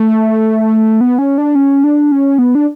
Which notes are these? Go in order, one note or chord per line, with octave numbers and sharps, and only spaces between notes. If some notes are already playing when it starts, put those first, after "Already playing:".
Already playing: A3
B3
C#4
D4
C#4
D4
C#4
B3
D4